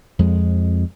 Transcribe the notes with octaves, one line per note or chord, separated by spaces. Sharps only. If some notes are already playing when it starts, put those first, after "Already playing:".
F2 G#3